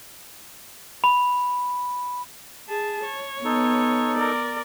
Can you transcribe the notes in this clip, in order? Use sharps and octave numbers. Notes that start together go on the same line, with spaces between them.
B5
G#4 A5
C#5
B3 D#4 A4
A#4 D5